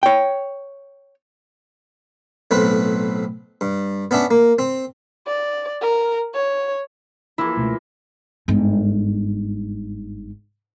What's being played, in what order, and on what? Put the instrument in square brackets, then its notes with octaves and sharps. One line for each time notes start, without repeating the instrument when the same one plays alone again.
[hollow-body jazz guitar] C#5 G5
[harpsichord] B1 A2 C4 B4
G2
B3 C#4 D4 E5
A#3
C4
[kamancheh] D5
A#4
C#5
[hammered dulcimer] E3 F3 A#3 [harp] E4
[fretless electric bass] C#2 B2 A3
[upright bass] G1 G#2